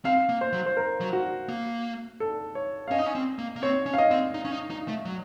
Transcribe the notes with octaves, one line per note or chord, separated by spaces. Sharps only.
C4 F5
A#3
C5
F#3
C5
A#4
F#3
F#4
A#3
A4
C#5
F5
C#4 D#5
D#4
C#4
C4
A#3
A#3
C4 C#5
C#4
F5
D#5
C4
D#4
C#4
D#4
D#4
A3
F#3